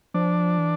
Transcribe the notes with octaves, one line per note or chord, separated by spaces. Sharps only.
F3 D4
E3